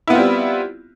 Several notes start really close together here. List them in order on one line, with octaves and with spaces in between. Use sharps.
E4 B3 F4 C4 G3